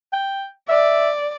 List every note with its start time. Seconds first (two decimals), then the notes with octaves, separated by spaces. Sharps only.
0.13 G5
0.69 D5 E5